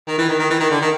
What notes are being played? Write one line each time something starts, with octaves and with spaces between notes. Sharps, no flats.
D#3
E3
D#3
D#3
E3
D#3
D3
D#3